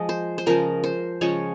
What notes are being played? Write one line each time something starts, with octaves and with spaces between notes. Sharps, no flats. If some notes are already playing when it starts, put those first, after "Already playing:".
Already playing: F3 G#3 D#5
C5
C5
C#3 F3 G#3 A#4
C5
C#3 F3 G#3 C#5